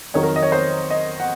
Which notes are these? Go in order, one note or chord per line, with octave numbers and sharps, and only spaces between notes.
F2 D#3 F#3 C#5
A#4
D#5
C#5
C5
D#5
F#5